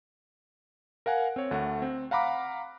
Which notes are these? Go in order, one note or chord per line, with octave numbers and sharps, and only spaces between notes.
A#4 F5 F#5 G#5
C4 C#5
D2 A3 F#5
C4
F5 F#5 A#5 B5 D6